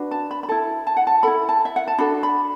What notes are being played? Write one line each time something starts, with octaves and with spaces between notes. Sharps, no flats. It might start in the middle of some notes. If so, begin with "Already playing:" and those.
Already playing: D4 F#4 B4
A5
B5
B5
E4 A4 A5
A5
F#5
A5
E4 A4 B5
A5
E5
F#5
A5
D4 F#4 A4 B5
B5